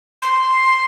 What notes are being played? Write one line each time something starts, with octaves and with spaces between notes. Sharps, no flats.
C6